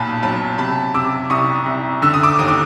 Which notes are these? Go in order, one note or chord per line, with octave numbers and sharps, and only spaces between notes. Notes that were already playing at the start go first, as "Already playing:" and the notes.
Already playing: B1 A#2 A5 B5
F#3 A5 B5
C3 A5 B5
C3 D6 E6
C2 C#6 D#6
C2
D3 E6
D#6
D6 E6
D#2 D#6
D6